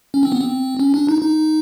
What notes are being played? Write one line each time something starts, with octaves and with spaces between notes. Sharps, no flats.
C#4
C4
B3
C4
C#4
D4
D#4
D#4